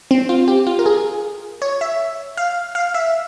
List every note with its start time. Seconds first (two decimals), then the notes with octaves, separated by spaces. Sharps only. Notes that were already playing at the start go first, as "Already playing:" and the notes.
0.11 C4
0.29 F4
0.48 G4
0.67 F4
0.79 A#4
0.86 G#4
1.62 C#5
1.81 E5
2.37 F5
2.75 F5
2.94 E5